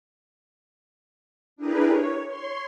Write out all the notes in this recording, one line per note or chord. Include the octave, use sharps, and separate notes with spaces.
D4 E4 G4 G#4 A#4 B4
C#5
C#5 C6